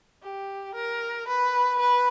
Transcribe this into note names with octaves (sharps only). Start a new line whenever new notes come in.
G4
A#4
B4
B4